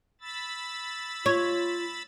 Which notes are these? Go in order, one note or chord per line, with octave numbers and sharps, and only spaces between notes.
B5 E6 A6
F4 C#5